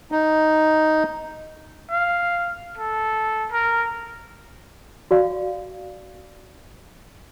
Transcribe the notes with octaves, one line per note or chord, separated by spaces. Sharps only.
D#4
F5
A4
A#4
F#4 D5 F5